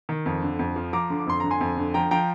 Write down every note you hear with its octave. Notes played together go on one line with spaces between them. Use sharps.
D#3
F2
D3
F2
F3
F3 A#5 D6
D3
D6
F2 C6
D3 A#5
G#5 C6
F2
D3
F3 G5 A#5
F3 G5 A#5